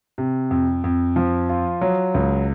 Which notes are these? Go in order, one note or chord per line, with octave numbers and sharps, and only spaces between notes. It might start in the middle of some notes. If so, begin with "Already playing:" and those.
C3
F2
F2
F3
F4
F#3
C#2